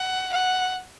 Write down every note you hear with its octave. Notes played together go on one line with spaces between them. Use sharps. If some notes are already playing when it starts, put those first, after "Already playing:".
Already playing: F#5
F#5